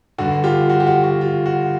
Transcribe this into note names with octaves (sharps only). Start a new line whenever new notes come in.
G2 D3 F#4
F4 G4
F#4
G4
F#4
F#4
F4
F#4